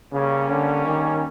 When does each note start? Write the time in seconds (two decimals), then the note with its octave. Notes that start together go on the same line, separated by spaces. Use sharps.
0.13 C#3 G3 A#3 C#4
0.49 D3
0.85 D#3